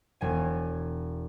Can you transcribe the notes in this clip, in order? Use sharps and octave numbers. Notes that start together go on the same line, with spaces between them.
E1 G#5